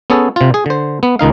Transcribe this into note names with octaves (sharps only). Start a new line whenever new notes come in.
B3 C#4 G#4 A4
C3 F4
G#4
D3 C5
B3
C#2 D#3 D#4 F5